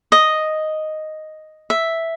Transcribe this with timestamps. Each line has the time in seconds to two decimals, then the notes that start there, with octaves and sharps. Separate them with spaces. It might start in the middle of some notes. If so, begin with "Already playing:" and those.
0.12 D#5
1.70 E5